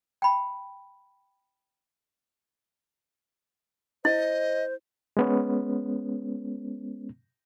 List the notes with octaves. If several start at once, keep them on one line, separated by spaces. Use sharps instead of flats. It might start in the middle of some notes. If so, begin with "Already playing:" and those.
G5 B5
E4 C5 D#5
G#3 B3 C#4